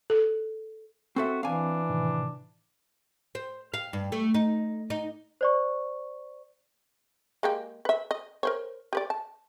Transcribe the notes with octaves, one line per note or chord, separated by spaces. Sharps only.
A4
C4 F#4 A4 E5
E3 C4 D4 F5 G#5
A2 C3 D#3
C5
F5
G2
A3
D#4
D#4
C5 D5 C#6
G#3 A#3 G4
B4 E5
D#5
A#4 C5 C#5
G4 B4 D5
A5